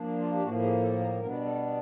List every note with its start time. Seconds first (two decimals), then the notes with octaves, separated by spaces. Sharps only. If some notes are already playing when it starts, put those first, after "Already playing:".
Already playing: F3 A#3 D4
0.18 F4
0.33 G4
0.43 A2 F3 A#3 F#4
0.62 G#4
0.81 A4
1.00 A#4
1.19 B2 G3 B3 D4 A#4
1.45 A4